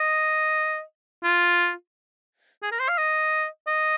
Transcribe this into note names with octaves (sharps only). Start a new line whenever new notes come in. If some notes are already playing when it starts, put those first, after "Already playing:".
Already playing: D#5
F4
G#4
A#4
C5
F5
D#5
D#5